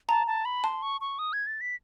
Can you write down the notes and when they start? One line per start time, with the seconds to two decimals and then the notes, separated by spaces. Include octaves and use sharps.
0.09 A5 A#5
0.27 A5
0.45 B5
0.64 A5 C6
0.82 C#6
1.01 C#6
1.19 D#6
1.33 G#6
1.47 A6
1.61 B6